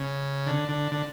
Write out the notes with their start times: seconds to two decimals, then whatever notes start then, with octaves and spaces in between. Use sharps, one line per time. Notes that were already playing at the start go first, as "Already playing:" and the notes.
Already playing: C#3
0.46 D3
0.69 D3
0.92 D3